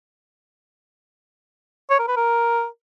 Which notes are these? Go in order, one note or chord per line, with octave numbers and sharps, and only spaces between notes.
C#5
A#4
B4
A#4